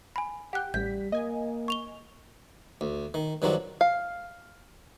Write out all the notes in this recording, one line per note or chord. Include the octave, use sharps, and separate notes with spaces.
G#5 B5
G4 F#5 G5 F#6
A1 G3 G6 B6
A#3 D#5 G#5
C#6 F7 G7
D2
D#3
G2 D#3 F3 F#3 D4
F5